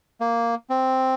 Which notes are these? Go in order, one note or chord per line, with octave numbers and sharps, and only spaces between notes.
A#3
C4